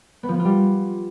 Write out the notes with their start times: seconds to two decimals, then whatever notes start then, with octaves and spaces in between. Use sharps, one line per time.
0.23 B3
0.29 F3
0.34 B3
0.39 F4
0.45 G3